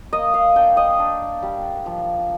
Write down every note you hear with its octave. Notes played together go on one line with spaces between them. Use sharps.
A#3 D#5
F5
D4 G5
D#5
D4
G3
F3